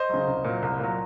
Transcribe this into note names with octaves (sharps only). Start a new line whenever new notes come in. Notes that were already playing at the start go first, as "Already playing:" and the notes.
Already playing: C5 D#5
C#3 F#3
C2
A#2 F#3
C2
A#2 F#3